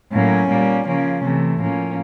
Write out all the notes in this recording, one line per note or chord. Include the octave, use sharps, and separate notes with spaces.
A2 F#3 A#3 C#4
A#2 G3 A#3
C#3 F3 A#3 C#4
C3 E3 A3
A2 F3 A#3 C#4